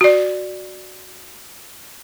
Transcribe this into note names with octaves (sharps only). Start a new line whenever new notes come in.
F#4 D5